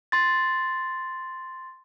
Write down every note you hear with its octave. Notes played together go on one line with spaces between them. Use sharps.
C6 A6